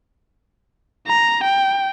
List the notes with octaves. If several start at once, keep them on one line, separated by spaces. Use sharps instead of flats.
A#5
G5